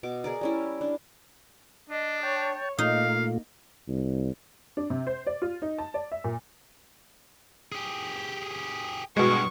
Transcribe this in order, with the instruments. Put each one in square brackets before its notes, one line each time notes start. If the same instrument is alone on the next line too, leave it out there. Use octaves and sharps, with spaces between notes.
[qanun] B2 D6
G#4 A#4 D5
G3 C#4 E4
D4
[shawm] D4 [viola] D#5
[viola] C#5 [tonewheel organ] G5 A5
[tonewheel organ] A#2 A3 F4 [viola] A#3 [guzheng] D#4 [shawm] F5
[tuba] C2
[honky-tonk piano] D4
C3
C5
D5
F4
D#4
A5
D5
E5
A#2
[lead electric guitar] G4 G#4
[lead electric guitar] G2 [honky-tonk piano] B2 G#3 [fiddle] C#6